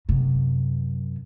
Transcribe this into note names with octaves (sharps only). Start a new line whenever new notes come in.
F#2 C3